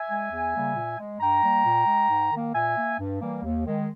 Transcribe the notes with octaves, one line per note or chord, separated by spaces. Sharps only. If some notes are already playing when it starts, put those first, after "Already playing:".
Already playing: E5 G#5
G#3
E2
C#3 G3 A#3
A#2
G#3
G2 G5 A#5
G3 A#3
A#2
G#3
G#2
D#3 A#3
A#2 E5 G#5
A#3
G2
E3 G3 A#3
D#2
D#3 G#3